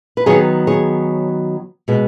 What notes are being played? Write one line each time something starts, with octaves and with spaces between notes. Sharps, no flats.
B4
D#3 F#3 B3 G#4 C#5
G#4 C#5
B2 G#3 B3